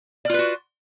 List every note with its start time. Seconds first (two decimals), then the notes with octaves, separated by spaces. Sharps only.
0.25 D5
0.30 F4
0.34 B4
0.39 F#4